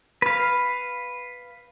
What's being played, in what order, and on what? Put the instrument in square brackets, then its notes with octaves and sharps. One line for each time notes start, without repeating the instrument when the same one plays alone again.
[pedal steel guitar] B4 F5